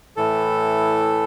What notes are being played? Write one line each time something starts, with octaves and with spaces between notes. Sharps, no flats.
A2 E3 A4